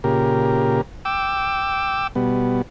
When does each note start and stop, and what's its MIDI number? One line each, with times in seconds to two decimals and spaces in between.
0.04 0.81 46
0.04 0.81 49
0.04 0.81 67
0.04 0.81 70
1.05 2.07 79
1.05 2.07 86
1.05 2.07 88
2.15 2.62 47
2.15 2.62 55
2.15 2.62 59